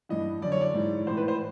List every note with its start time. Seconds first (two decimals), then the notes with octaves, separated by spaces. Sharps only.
0.09 G2 E3 D#5
0.42 F#2 D3 D5
0.52 C#5
0.61 D5
0.74 G#2 E3
1.06 A2 E3 C5
1.17 B4
1.28 C5